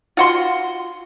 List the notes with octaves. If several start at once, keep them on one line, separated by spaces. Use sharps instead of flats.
F4 F#4 C6